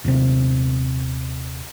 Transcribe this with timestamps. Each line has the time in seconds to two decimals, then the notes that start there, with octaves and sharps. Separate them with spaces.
0.04 D#1 C3